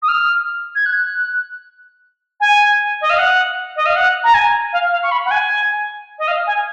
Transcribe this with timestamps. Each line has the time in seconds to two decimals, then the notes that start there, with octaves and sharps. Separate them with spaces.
0.02 D#6
0.08 F6
0.75 G#6
0.85 F#6
2.40 G#5
3.01 D#5
3.09 F5
3.18 F#5
3.76 D#5
3.85 F5
3.95 F#5
4.23 A#5
4.34 G#5
4.72 F5
4.91 F5
5.03 C#6
5.11 B5
5.25 F#5
5.30 G#5
6.18 D#5
6.27 F5
6.47 G#5